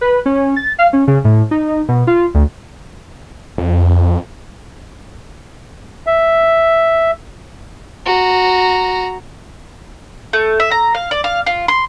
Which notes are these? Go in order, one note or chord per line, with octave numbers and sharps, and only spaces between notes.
B4
C#4
A6
F5
C#4
C#3
A2
D#4
B2
F4
D2
F2
E5
F#4 A#5
A3
E5
A#5
F5
D5
F5
F4
C6